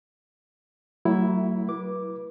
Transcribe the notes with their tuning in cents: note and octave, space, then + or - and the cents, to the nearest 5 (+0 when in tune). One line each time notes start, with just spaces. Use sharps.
F#3 +20 A3 +35 E4 +0
B4 -30 D6 +0